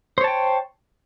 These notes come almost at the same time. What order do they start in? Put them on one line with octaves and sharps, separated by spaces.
C5 C#5 A5 G5